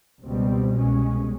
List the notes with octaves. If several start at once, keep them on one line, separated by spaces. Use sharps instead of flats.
C#2 B2 G3 C4
C2 B2 G#3 C#4